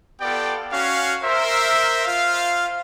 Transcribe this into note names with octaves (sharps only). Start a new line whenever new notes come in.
B3 F4 G4 A4 D5 G5
C#4 F#4 F5
A#4 C5 E5
F4 C5 F5